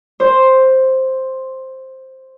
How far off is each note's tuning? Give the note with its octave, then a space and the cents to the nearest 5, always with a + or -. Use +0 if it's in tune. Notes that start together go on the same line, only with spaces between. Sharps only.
C5 +5